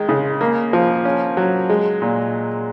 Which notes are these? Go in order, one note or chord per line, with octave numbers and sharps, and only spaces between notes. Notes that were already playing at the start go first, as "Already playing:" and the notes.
Already playing: D#3 G#3
C#3
A#3
F3
C#4
F#3
G#3
A#2